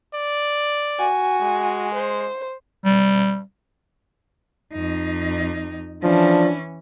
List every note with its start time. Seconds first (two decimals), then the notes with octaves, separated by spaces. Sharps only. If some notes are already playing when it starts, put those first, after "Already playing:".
0.14 D5
0.99 F#4 G#5
1.42 G#3
1.94 C5
2.84 G3
4.73 F2 D#4
6.03 E3 F3 C#4 D4